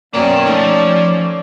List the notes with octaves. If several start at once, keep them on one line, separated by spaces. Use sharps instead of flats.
F#2 B2 A#3 C#4 D5 G5 A#5
F3 A3 D#4